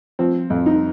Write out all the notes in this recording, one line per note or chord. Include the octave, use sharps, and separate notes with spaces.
F3 C4
F2
D#4